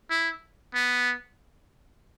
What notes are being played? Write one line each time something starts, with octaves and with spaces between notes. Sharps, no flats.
E4
B3